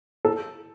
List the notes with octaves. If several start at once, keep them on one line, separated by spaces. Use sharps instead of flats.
A4